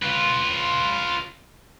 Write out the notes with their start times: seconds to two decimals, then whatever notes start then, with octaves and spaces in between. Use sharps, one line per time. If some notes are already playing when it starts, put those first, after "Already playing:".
0.02 F4 B4